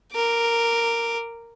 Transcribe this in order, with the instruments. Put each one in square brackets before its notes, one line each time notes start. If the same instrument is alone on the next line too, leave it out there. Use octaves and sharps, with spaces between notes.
[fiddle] A#4 D6